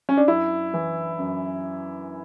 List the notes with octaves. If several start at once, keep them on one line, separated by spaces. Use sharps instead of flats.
C#4
D4
F#2 E4
E3
F#2